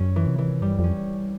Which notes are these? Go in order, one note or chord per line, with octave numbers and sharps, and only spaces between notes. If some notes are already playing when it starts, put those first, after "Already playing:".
Already playing: F#2 C#4
E3
C3
E3
G2 G3
F2 C#4